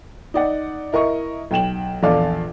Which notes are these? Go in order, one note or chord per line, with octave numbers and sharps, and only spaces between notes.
D#4 D5 F#5
E4 A#4 D#5 C#6
B1 G5 E7 F#7
A#1 E2 A4 D5 F5 D6